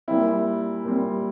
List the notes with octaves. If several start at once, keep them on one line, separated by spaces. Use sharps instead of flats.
A#2 G3 C4 E4
A#2 G3 C4